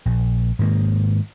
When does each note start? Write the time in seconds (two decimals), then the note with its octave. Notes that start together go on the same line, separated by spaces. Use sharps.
0.06 A#1
0.59 G#2 D#3 A#3